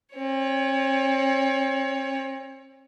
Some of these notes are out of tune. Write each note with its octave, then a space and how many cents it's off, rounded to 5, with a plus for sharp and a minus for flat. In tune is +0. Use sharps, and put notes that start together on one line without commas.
C4 +45 C#5 +25